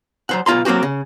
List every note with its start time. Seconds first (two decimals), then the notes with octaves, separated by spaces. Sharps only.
0.29 F#3 C5 F#5
0.46 B1 B2 F4 A#5 C6
0.65 F#3 A#3 C4 F#4 G4
0.83 C#3